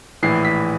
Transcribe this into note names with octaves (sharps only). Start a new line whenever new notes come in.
A#1 A2 E3 C7
B6